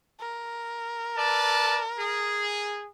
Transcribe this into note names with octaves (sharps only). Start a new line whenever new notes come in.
A#4
B4 D5 A5
G#4